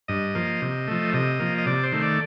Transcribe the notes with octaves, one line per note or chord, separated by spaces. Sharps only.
G2 D#5
F3 A#3
C3
F3 A3
C3 D#5
F3 A#3
D#5
C3 D5
C5
D#3 A3
D5